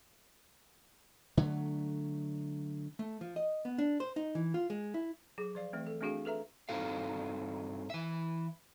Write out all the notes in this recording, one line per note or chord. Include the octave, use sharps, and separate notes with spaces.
D3 F#3 A3
A3
F3
D#5
B3
D4
C5
D#4
E3
F4
G#3
E4
F#3 G#4
F3 D5 F5
E3 A3 C4
A4
A3 C4 D4 F#4 G#4 F5
A4 B4 E5 A#5
G2 C4 D#4 F#4 A4 F5
E3 E5